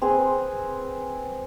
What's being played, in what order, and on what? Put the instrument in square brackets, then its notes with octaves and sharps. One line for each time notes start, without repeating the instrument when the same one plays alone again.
[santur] C4 G#4 B4